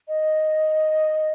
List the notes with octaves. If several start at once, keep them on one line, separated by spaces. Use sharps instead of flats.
D#5